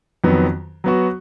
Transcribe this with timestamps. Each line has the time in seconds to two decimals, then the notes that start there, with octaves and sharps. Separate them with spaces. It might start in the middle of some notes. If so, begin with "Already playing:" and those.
0.24 F2 D#3 F#3 B3
0.84 F#3 B3 F#4